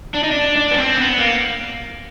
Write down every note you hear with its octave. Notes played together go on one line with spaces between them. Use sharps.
D4
D#4
D4
D4
B3
C4
B3
A#3